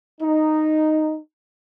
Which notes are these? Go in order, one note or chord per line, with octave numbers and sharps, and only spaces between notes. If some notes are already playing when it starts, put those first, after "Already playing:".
D#4